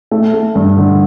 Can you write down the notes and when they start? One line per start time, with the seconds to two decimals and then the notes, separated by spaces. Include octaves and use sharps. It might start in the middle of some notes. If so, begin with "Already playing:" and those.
0.11 A3
0.34 A3
0.55 G2
0.77 D3